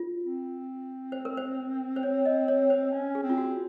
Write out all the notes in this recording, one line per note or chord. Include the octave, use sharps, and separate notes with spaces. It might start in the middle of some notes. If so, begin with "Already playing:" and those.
Already playing: F4
C4
C5
A#4
C5
C5
C#5
D#5
C#5
C5
C#4
G#4
C4
F4
F#4